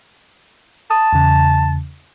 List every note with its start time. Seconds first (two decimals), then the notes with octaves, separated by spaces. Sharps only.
0.91 A5 D#6
1.13 E2 C#3